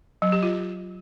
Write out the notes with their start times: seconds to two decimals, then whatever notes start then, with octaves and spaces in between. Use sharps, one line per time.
0.22 F#3
0.32 G4
0.43 F4